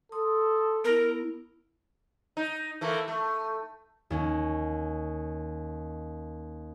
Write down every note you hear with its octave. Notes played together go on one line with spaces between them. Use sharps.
A4 C6 D#6
B3 E4 A#4
D#4
E3 A3 A#3
A3
D#2 C#4